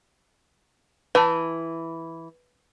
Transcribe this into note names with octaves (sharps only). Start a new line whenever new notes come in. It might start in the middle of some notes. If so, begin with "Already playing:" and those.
E3 B4 A5